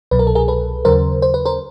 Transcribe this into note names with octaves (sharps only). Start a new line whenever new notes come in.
C2 B2 F#3 B4
A#4
A4
G#4 A#4
A4 B4
D#2 C#3 F#3 A#4 C5
C5
B4
A#4 C5